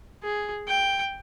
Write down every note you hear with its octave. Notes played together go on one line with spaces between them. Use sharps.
G#4
G5